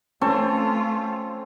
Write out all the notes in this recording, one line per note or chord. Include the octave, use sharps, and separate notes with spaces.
A3 C4 C#4 F4 A4